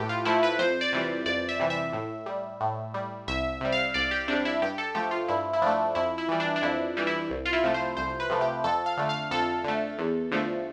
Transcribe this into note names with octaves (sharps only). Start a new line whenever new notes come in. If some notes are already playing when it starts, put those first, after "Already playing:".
Already playing: A2 A3 G4 A4 B4
F4
F3 A3 E4
B4
F2 C5
D5
C3 E3 G3
F2 D5
E5
C3 E3 G3
E5
A2
G3
A2
G3
C2 E5
C3 G3
F5
C2 D5
G4
C3 G3 D4
E4
G2 G4
A4
F3 A3 G4
F4
G2 E4
E4
F3 A3 D4
F2 E4
E4
E3 G3
D4
D4
F2 E4
E3 G3
E4
C2
F4
E4
C3 F3 A3
C5
C2 C5
B4
C3 F3 A3
G4
F2 A4
F5
D3 A3
F5
F2 A4
D3 A3
E2
D3 F3 A3